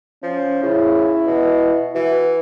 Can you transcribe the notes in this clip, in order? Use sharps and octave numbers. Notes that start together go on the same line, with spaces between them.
F3 C#4
C#3 E4
B2
E3 F#4